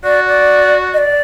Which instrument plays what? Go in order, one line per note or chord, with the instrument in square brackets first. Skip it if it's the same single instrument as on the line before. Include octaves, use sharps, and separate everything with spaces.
[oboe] F#4 [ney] D5
[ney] D5
D#5
D5